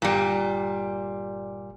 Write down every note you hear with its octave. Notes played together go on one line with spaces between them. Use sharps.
G1 A#2 G3